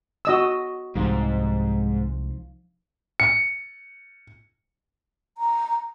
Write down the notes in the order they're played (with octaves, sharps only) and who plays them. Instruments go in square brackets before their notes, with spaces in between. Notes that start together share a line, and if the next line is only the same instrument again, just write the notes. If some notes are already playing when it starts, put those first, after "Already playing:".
[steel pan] F#4 D#5 E6
[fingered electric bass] C2 G3 G#3 [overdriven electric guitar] G#2 [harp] F3 D#4
[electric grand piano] C#7
[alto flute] A#5